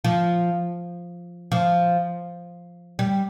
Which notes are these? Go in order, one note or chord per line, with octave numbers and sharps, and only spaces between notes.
F3
F3
G3